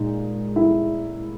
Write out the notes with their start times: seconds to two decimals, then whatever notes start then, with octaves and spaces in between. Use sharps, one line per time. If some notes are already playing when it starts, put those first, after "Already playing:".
Already playing: A#2 G#3 D#4
0.56 E4